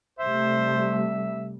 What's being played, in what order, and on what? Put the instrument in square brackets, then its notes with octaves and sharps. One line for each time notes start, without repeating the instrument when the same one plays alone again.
[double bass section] C3 G3 A3 [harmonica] C5 [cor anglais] E5